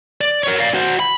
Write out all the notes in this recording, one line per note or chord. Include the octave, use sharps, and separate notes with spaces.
D5
A#4 C#5
D5 F5
F#4 C5
B5